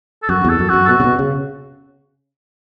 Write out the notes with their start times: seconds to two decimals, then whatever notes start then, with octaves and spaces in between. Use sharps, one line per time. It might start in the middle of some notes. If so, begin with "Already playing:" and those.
0.23 A4
0.29 F#2 F#4
0.45 E2 A4
0.59 F#2
0.69 F#2 F#4
0.85 A4
0.88 B2 F#4
1.00 C#3
1.04 B2
1.19 C#3